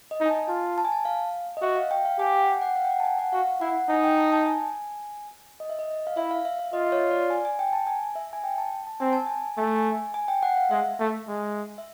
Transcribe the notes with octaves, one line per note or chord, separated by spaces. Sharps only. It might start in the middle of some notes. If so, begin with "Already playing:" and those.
D#5
D#4
G#5
A5
F4 A5
A5
G#5
A5
F5
D#5
F#4 E5
F5
G5
F5
G4 G#5
G5
G#5
F#5
G5
F#5
F5
G5
F#5
A5
G#5
F#5
F#4 F5
E4 F#5
D#4 G#5
G5
A5
A5
G#5
D#5
E5
D#5
F5
E4 E5
F5
E5
E5
F4 D#5
C#5
D5
G#5
G#5
G5
A5
G#5
E5
G#5
G5
A5
A5
C4 G#5
A5
G#5
A3 G#5
G#5
G#5
G5
F#5
F5
G#3 E5
A3
G#3
E5